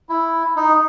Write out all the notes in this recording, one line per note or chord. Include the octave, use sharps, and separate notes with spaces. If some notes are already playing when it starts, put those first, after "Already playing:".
E4
D#4